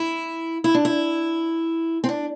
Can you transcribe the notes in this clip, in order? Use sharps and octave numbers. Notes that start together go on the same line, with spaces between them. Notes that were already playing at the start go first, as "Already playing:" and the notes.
Already playing: E4
E4
D4
E4
C4
D4